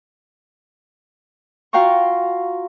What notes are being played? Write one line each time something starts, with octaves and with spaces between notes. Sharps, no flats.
F4 F#4 F5 G5 A#5 C#6